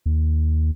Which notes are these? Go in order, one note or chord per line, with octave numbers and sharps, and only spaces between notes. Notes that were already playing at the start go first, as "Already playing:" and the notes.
D#2